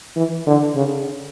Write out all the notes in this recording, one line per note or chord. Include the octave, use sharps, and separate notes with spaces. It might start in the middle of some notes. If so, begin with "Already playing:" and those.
E3
D3
C#3